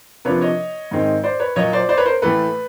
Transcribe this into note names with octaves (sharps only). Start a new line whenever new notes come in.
C3 F3 A#3 D4 B4 C#5
C#5 D#5
G#2 D#3 G#3 C4 D#4
C5 D5
B4 C#5
A#2 F#3 A#3 C#5 D#5
C5 D5
C5 D5
B4 C#5
A#4 C5
A2 E3 A3 B4